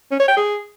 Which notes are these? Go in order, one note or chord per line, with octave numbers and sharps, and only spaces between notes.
C#4
C#5
G5
G#4